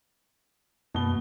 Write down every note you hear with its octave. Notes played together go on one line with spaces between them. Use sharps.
F#2 B2 A#3 G7